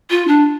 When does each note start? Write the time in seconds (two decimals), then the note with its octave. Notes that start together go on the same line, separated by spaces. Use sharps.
0.10 F4
0.28 D4